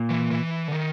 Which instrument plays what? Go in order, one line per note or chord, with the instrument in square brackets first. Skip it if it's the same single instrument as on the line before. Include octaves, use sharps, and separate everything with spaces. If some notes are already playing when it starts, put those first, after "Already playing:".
Already playing: [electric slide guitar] A#2
[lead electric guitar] E3
E3
D3
D#3